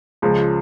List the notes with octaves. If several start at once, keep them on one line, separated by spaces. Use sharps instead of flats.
C#2 C#3 F3 G#3